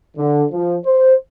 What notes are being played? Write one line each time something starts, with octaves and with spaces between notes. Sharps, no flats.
D3
F3
C5